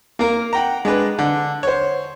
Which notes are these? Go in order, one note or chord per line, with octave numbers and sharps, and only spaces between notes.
A#3 A#4
F#5 G5 A#5
G#3 D4 B4
D3
C5 C#5